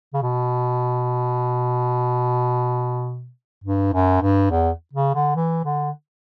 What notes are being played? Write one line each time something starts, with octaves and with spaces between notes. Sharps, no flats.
C#3
B2
G2
F#2
G2
E2
C#3
D3
E3
D3